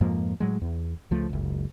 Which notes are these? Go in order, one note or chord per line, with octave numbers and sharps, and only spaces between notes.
F2 G#2 F3 A#3
A2 F#3 G#3
E2
C#2 F3 A3
F#1 C#2